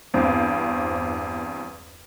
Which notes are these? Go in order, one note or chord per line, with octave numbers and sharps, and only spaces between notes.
E2 G2 C4